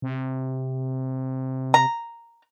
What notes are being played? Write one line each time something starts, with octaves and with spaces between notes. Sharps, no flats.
C3
A#5